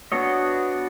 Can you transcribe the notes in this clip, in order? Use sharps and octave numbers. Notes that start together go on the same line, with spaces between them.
B3 D4 F#4 C#5 D#5